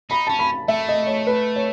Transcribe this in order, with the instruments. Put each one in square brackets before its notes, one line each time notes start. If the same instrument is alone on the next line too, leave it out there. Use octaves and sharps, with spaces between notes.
[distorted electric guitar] D#4 [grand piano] B5
[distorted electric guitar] C#4 [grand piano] A5
[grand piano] B5
[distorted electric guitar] A3 [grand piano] E5
[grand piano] D#5
C#5
B4
C#5